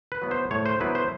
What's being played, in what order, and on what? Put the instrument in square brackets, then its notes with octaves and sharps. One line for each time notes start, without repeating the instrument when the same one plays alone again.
[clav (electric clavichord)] B4
F#3 B3 E4
C5
A2 C#5
C5
F#3 B3 E4 B4
C5